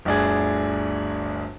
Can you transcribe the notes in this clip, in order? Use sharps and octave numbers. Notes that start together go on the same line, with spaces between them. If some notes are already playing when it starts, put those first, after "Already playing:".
G1 D2 D4 G#4